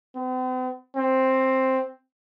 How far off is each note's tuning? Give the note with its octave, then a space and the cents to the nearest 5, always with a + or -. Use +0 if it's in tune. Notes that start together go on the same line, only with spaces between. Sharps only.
C4 -45
C4 +5